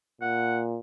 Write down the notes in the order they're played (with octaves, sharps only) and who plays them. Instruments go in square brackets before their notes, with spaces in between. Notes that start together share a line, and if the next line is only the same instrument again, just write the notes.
[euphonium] A#2 [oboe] F#5